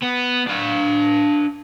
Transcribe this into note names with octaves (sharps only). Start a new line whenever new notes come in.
B3
D4 F5